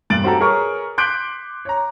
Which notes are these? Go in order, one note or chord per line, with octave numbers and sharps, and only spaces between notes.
E1 G2 A6 D7 F#7
C4 F#4 G4 A4 A#5
G#4 A#4 B4 C#5 C#6
C6 D6 F#6 G6 B6 D7
C#5 A#5